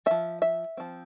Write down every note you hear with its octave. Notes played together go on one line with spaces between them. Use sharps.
F3 C4 E5
E5
F3 C4